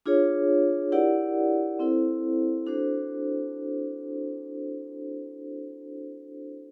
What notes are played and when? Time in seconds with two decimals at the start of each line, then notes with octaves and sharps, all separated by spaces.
0.06 D4 F4 G#4 C#5
0.92 E4 G4 A#4 D5 F#5
1.79 C4 E4 A4 C5
2.67 D4 F#4 A4 C5